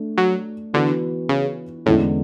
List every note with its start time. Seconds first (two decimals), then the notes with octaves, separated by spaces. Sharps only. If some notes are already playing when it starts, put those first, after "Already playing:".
Already playing: A3 D4
0.18 F#3
0.73 D3 E3 B3 F#4 B4
1.29 C#3
1.86 E2 A2 D3 G#3 C#4